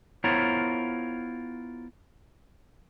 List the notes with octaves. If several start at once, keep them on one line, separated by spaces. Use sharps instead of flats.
B3 E4 F4 A#4 C5 C#5